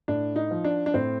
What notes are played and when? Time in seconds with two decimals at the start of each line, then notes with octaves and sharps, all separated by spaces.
0.08 A2 D4
0.36 D#4
0.51 F3
0.64 D4
0.86 D4
0.94 A2 C4